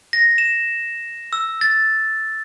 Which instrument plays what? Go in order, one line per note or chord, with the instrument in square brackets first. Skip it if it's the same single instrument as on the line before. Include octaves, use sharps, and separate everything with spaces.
[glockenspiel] A#6
E7
E6
A6